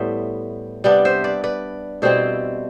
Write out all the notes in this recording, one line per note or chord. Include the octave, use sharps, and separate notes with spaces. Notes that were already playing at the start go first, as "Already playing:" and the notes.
Already playing: A2 G3 B3 C5 E5
C3 G3 B3 D4 B4 D5
C5 E5
B4 D5
B4 D5
B2 G3 C4 E4 A4 C5